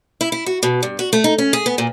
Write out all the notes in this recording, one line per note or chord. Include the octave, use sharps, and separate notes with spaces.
E4
E4
F#4
B2
G2
F#4
A3
D#4
C#4
G#4
B3
A#2